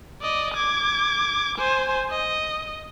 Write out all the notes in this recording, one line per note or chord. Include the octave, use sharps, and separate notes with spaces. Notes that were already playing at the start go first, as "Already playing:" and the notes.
D5 D#5
D6 G#6
C5 G#5
D#5